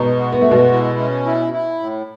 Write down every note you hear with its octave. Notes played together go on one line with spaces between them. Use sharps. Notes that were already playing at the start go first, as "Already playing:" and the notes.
Already playing: B2 G#3 B3 D#4
F#4
B3
G#3 A3
B2 B3
E4
C#4
E4
E4
A2